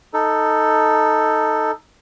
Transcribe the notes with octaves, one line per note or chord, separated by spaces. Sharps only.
D#4 A4